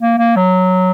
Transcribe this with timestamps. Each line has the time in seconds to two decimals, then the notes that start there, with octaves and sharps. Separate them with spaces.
0.02 A#3
0.18 A#3
0.36 F#3